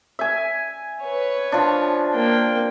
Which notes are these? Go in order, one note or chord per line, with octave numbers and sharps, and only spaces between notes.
E5 G#5
B4 C#5
F3 D4
A#3 G5